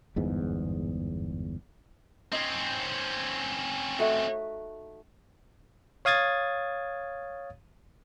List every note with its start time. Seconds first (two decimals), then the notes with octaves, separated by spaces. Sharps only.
0.16 G1 E2 G#2
2.33 C4 C#4 D#4
3.99 A3 D#4 F#4
6.05 C#5 F5 D#6 G#6 A6